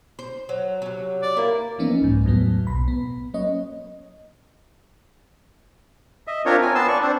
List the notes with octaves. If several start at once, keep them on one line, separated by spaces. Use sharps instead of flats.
C5
F#3
C3 F#3
D5
A#3 E4
E3 F3 A#3 B3 C#4 D#4
C2 G#2
E2 A2 F#3 B3
B1 B2 B5
B3
F#3 A#3 C#4 C#5 D#5
D#5 E5
C4 D4 F4 A#4 C#5
G#5
B3 A5 C6 E6
D5 C#6
C4 D4